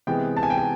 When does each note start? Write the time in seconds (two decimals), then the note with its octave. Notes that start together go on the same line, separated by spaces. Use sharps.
0.07 C3 E3 G#3 B3 G5
0.37 A5
0.43 G#5
0.50 G5
0.58 G#5